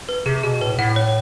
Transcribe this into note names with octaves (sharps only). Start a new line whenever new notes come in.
B4
C3 G#4
B2 G#4
A2 B4
A2 F#5
C#5